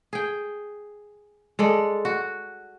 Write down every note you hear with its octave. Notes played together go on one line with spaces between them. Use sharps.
G#4 G5
G#3 A4 D5
F#4